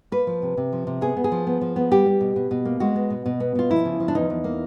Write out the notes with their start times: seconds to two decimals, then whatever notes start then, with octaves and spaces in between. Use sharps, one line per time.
0.12 A#3 B4
0.27 F3
0.42 C3
0.57 C3
0.72 F3
0.87 C3
1.01 B3 G#4
1.17 B3
1.24 G#4
1.32 F3
1.47 B3
1.61 F3
1.76 B3
1.91 G3 G4
2.06 G3
2.21 B2
2.36 B2
2.51 B2
2.65 A#3
2.80 G#3 F#4
2.96 B3
3.10 B2
3.26 B2
3.40 B3
3.55 B2 F4
3.70 F3 E4
3.85 C#3
4.00 F3
4.08 D4
4.15 E2 D#4
4.30 E2
4.44 A#3